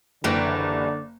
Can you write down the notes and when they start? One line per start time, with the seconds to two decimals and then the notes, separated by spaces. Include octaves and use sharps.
0.24 F#1 D3 E3 G3 D5 A#5